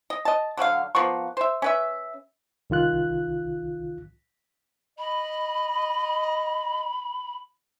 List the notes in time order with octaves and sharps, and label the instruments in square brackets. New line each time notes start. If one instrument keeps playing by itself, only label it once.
[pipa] D#5
D#5 A5
D3 F#3 C#5 F5
F3 A#3 B3 C#6
C5 E5
C#4 B4 E5
[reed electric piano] C2 D#3 F4 F#6
[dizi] D#5 [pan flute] B5